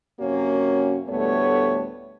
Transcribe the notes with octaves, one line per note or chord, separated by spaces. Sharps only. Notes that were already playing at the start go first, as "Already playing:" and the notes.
F#2 C3 A#3 C#4 F#4 C#5
D2 A2 G3 A3 B3 C#5